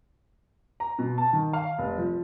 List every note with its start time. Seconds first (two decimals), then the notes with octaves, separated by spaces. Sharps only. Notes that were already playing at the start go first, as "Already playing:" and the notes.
0.80 A#5
0.99 B2
1.18 A5
1.33 D#3
1.53 F5
1.78 F1
1.98 F3